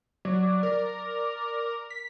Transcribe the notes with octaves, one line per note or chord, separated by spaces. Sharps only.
F#3 D5
D5
A#4
B6